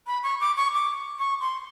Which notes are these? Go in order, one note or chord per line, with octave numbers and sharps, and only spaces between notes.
B5
C#6
D6
C#6
D6
C#6
C6